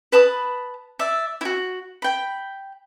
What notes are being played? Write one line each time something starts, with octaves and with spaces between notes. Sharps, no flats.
B4 A5 B5 D#6
D5 E5
E4 F#4
G5 B5